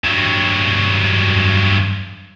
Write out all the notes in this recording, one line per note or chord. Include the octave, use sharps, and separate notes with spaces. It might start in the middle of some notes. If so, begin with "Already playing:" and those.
G2 F#3